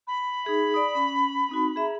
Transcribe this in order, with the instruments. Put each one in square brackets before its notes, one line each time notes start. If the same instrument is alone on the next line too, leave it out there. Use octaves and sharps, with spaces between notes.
[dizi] B5
[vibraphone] D#4 G#4 E5
D5 D#6
C#4
C4 D#4 F#4
G#4 E5 A#5